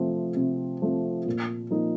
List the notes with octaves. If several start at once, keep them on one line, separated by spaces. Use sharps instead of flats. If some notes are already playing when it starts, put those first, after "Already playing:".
Already playing: C3 F3 A3 C4
C3
F3 A3 C4
A#2
F3 A#3 D#4